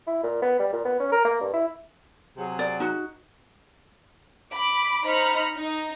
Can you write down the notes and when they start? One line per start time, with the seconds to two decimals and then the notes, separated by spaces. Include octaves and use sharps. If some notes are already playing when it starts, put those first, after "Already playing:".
0.07 E4
0.23 A#2
0.42 B3
0.59 G3
0.73 A#2
0.85 B3
1.00 C#4
1.12 A#4
1.25 A#3
1.40 G2
1.53 E4
2.38 C3 F#3 G#4
2.59 D5
2.80 D#4 F#4
4.52 B5 D6
5.03 D#4 C5 A#5 B5 F6 C#7
5.57 D#4